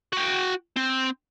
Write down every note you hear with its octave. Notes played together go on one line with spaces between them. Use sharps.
F#4 G5
C4